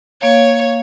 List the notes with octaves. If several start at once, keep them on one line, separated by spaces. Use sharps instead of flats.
A#3 C#5 F5